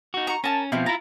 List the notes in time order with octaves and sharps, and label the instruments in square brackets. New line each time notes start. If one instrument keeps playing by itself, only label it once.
[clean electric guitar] D#4 F#4
[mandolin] A#5 C#6
[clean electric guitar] C#4 [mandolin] A#4 A5
[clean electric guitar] B2 F3 [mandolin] C4 E4 F5
[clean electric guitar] E4 F4 [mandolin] A#5